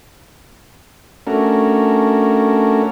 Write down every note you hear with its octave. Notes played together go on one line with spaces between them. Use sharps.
A3 C#4 D4 F#4 A#4